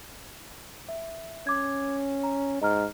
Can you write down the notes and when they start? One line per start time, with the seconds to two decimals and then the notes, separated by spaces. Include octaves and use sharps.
0.89 E5
1.47 C#4 D6 G#6
2.23 A#5
2.62 G#2 D#5 A#5 F6